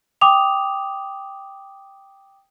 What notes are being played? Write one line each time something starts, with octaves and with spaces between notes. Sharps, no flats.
G5 D6 D#6 F7